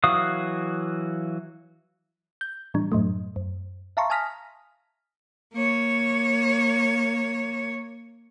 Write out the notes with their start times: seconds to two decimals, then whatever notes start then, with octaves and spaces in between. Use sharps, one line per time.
0.04 E3 F#3 F#4 F5 D#6
2.41 G6
2.74 A2 E3 G3 D4
2.92 F#2 A2 F#3 A3
3.36 F#2
3.97 E5 F5 A5 A#5 C6 C#6
4.10 G#5 A5 D#6 F6 A#6 B6
5.54 A#3 C#5